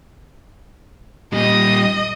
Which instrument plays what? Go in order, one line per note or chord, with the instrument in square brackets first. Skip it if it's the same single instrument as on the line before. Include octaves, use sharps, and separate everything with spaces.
[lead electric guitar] A#2 G3 [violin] D#5